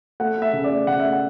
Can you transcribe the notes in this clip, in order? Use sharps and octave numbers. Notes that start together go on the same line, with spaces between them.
A3 F#5
A3
E5
C#3
D5
A3
C#3 F#5
A3 E5
F#5